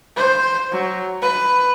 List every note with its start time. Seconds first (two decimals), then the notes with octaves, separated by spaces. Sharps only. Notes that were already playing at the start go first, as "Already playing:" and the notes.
0.17 C5
0.72 F#3
1.22 B4